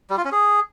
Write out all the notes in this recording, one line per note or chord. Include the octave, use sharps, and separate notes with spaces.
G3
F4
C#4
G#4